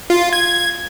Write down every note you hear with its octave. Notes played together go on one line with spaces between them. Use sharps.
F4
G#6